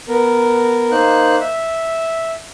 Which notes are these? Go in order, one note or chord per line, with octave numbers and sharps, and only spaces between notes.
B3 A#4
A#3 D#4 C5 F#6
E5